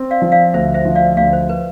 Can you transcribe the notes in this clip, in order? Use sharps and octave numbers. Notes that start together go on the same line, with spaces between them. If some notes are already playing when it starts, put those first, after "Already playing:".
Already playing: C4
D5 F5
F3
D5 F5
D2 C5 E5
C5 E5
F3
D5 F5
D2 D5 F5
C5
B4